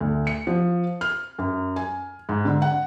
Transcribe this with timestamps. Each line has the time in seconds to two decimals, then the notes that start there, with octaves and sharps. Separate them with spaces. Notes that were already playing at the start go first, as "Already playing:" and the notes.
0.01 D2
0.27 C#7
0.47 F3
1.01 F6
1.38 F#2
1.76 G#5
2.29 G#2
2.45 D3
2.62 F#5